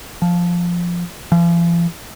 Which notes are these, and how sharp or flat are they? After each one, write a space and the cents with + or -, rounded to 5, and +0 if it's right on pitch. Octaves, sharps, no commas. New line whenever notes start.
F3 +0
F3 -45